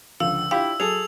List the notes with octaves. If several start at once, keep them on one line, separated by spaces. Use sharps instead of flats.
C#2 D3 F3 F5 E6
D4 E4 F4 G4 F5
F#3 G#4 A4 F7